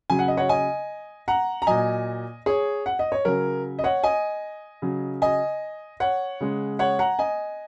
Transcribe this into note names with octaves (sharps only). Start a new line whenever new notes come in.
C#3 F#3 G#5
F#5
D#5
C#5 F#5
D#5 G#5
F#5 A#5
A#5
A#2 F#3 D#5 G#5
G#4 C#5
F#5
D#5
C#5
C#3 F#3 A#4
D#5
C#5 F#5
D#5 G#5
C#3 F#3
D#5 G#5
C#5 F#5
C#3 G#3
C#5 F#5
F#5 A#5
D#5 G#5